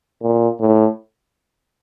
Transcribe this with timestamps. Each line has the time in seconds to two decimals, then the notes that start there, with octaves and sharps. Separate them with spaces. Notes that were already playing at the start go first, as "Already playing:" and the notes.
0.22 A#2
0.60 A2